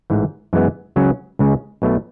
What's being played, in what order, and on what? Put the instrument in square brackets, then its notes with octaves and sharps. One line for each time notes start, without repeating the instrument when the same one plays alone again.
[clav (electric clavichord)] A1 G#2 E3
F#2 E3 G#3 B3
C#2 C#3 F#3 C#4
C#2 C#3 G#3 C#4
B1 B2 A3